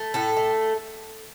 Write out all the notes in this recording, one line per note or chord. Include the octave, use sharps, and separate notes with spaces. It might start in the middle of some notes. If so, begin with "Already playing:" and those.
Already playing: A3
A2 A4
A3